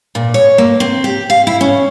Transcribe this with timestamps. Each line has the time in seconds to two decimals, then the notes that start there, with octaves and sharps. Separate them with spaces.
0.15 A#2
0.34 C#5
0.58 A#3
0.80 C4
1.04 G4
1.30 F5
1.47 E4
1.61 C#4